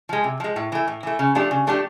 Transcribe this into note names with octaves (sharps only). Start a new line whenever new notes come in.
F3 G#3
C3
F3 G#3
A2
E3 A3
A2
E3 A3
C#3
F3 A3 D4 G4
C#3
F3 A3 D4 G4